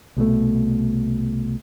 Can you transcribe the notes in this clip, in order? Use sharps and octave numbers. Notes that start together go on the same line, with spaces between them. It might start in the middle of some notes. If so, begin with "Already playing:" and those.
C2 B2 F#3 A3